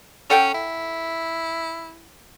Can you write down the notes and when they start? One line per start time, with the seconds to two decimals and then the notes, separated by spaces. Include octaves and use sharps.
0.30 C#4 A4 F#5 G5
0.54 E4